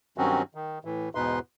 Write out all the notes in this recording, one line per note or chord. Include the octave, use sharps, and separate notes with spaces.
G2 D#3 F#3 C4 C#4 F#4
D#3
A2 E3
E2 G#2 B2 D#4 B4 C6